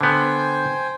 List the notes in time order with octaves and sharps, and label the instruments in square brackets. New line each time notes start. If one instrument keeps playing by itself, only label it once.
[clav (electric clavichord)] D3 B3 [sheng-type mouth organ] C5 G5 G#5